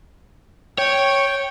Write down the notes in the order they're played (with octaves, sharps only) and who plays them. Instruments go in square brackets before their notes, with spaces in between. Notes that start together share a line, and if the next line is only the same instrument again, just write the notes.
[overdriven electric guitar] C#5 [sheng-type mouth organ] G5